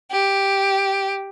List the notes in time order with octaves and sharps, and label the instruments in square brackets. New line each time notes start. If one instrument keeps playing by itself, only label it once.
[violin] G4